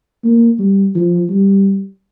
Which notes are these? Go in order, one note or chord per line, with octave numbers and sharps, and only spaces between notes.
A#3
G3
F3
G3